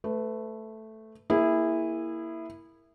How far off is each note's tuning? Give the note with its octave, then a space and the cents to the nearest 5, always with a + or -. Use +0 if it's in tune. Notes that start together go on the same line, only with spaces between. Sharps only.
A3 +0 B4 +20
A#3 +0 E4 +0 G#4 -25